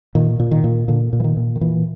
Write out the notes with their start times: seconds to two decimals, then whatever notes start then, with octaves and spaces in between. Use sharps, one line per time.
0.15 A#2 D#3
0.40 A#2
0.51 D#3
0.64 A#2
0.88 A#2 D3
1.13 A#2
1.20 E3
1.24 D#3
1.37 A#2
1.56 D#3
1.61 A#2 E3